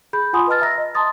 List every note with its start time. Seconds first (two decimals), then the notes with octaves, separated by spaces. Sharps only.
0.13 G#4 B5 G6
0.33 F4 F#5 G#5 B5 C6 D#6
0.47 B4 D#5 A5 F6 A6
0.61 E5 A#5 E6 A#6
0.78 D#5
0.95 A5 A#5 C6 D#6 A6